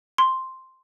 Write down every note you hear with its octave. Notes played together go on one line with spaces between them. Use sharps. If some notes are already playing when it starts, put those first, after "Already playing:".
C6